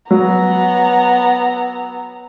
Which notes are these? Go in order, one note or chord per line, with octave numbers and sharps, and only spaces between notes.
F#3 B3 A#5